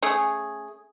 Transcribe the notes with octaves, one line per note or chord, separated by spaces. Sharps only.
A3 C#4 G#4